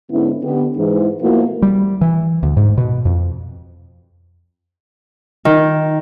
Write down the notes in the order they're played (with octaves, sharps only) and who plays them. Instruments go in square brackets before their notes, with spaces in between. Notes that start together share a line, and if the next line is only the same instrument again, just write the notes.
[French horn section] G#2 D3 B3 C#4 E4
D3 B3 G4
G#2 E3
B2 F3 A3 A#3 E4 F#4
[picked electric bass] G3
E3
D2
G#2
B2
F2
[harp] D#3